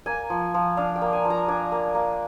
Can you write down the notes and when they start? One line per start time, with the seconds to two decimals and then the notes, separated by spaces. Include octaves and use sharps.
0.06 A#3 G#5
0.30 F3
0.54 F3
0.77 D4 F5
0.96 G5
1.02 A#3
1.13 G#5
1.25 F3
1.30 A#5
1.48 D4 G#5
1.72 A#3
1.95 A#3